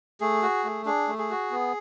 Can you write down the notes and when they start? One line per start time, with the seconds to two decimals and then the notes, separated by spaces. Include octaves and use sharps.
0.21 A3 G#4
0.42 F#4
0.64 A3
0.85 D4 G#4
1.08 A3
1.18 G#4
1.30 F#4
1.51 B3